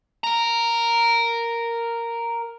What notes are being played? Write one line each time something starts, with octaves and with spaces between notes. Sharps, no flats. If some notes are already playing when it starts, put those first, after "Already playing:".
A#4 A#5